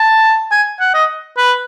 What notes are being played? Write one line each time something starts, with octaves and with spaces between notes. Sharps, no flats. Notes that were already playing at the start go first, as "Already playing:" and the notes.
Already playing: A5
G#5
F#5
D#5
B4